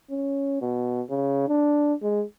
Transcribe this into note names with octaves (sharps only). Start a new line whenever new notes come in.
C#4
B2
C#3
D4
G#3